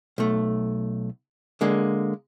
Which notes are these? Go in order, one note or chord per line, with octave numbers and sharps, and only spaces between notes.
B1 A3
D3 G#3 A#3